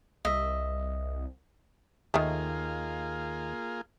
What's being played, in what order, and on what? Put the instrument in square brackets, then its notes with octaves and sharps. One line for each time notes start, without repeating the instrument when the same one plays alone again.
[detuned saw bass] C2 [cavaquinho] D#5 E5
[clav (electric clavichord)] D#2 [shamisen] D#3 A3 [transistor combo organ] A#3 F4 G#4